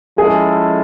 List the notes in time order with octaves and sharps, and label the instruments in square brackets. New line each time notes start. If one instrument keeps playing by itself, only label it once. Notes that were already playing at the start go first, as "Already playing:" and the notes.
[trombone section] F3 G#3 C#4 E4 A4 [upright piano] G#4